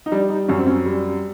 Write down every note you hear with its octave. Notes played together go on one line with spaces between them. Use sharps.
D#4
G3 D4
D#4
F#2 C#4
C4
C#4
G3